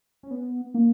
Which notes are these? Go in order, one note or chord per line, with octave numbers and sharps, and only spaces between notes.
C#4
B3
A#3